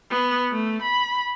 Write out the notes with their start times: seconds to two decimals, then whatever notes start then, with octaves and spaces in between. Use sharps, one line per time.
0.11 B3
0.51 A3
0.82 B5